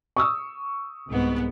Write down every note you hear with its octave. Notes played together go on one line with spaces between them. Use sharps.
C#6 D#6 E6
C2 G#2 B3